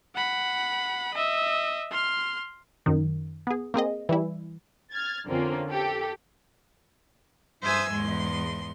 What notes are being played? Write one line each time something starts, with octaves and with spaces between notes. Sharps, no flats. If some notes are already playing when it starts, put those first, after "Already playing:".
F#5 B5
D#5 E5
C6 F6
F#2 D#3
B3 G#4
A#3 C4 G#4 D#5
E3 G3 E4
F6 G#6 A6
F2 D3 A#3 C4 C#4 F4
G4 A4
G2 C5 E5 G#5 D#6 E6
E2 G#2 G#3 C6